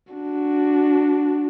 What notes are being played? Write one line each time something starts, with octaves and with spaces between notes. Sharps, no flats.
D4 F#4